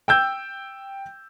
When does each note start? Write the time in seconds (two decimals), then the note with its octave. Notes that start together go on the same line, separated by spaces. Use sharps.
0.08 G5 E6 G6